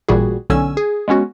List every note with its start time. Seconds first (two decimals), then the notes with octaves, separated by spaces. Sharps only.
0.09 A1 A#2 G3 F#4 G#4
0.50 B1 D3 C#4 G#5 E6
0.77 G#4
1.08 G#3 B3 C#4 F#4